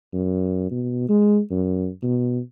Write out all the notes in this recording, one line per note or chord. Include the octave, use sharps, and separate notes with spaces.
F#2
B2
G#3
F#2
B2